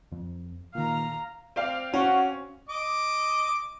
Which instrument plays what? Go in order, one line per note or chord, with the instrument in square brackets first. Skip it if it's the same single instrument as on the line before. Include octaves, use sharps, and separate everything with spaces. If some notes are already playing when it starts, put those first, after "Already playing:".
[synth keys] F2
[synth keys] A#2 D#3 [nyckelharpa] F5 A#5
[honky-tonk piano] C4 D5 F5
[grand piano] C#4 [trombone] F#4
[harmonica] D#5 D6